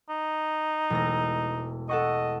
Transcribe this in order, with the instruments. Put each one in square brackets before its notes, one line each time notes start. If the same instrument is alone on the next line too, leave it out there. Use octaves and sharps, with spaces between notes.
[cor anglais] D#4
[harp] E1 A3 A#6
[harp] A4 F#5 C#6 [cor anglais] D#5